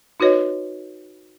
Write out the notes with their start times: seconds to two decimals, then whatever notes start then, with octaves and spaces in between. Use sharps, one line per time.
0.20 D#4 F#4 B4 C#5 D#5